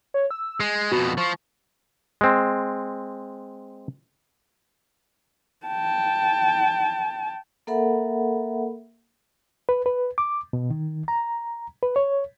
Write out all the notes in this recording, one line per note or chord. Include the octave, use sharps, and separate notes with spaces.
C#5
E6
G#3 C7
F2 B2 F#4
F3 C#6
G#3 C4
G5 A5
A#3 A4 A#4 E5 F#5 B5
B4
B4
D6
B2
D#3
A#5
B4
C#5